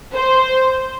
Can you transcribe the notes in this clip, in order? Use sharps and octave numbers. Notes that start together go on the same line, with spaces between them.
C5